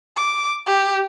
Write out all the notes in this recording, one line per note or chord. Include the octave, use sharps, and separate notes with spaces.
D6
G4